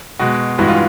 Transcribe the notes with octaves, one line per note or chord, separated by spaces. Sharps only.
B2 G#3 F#4
G2 E3 G#3 F#4
F4